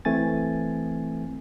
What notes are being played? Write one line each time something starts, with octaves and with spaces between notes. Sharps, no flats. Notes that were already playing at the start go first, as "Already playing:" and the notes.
E3 A3 C4 G#5 A6